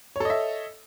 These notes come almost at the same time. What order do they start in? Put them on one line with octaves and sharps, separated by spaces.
C#5 A4 D#5 E5